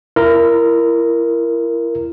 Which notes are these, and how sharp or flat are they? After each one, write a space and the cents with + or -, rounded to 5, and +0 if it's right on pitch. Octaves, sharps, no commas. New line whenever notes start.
E4 +35 A#4 +0